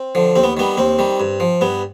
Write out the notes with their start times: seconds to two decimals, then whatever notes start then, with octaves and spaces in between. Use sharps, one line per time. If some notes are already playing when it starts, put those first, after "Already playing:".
Already playing: C4
0.15 D3 F3
0.35 D#2 C4
0.44 B3
0.57 D#3 G3 B3
0.77 D#2 C4
0.99 D#3 G3
1.20 G2
1.40 F3
1.61 G2 B3